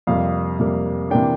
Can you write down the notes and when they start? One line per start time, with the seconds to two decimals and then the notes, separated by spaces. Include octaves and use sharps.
0.07 F2 C3 G3 A#3 F5
0.59 F2 C3 G3 A#3
1.10 C3 E3 A#3 D4 G5